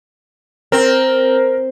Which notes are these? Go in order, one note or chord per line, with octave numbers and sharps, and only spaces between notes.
C4 A#4